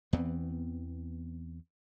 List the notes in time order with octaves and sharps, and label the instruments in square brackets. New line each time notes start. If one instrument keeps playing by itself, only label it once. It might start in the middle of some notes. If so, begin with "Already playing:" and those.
[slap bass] E2 E3 B3 C4